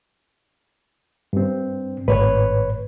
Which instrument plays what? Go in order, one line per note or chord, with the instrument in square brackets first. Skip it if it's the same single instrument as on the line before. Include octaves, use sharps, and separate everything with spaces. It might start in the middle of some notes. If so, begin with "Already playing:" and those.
[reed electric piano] G2 C4
[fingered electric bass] G#1 A2 [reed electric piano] B4 C#5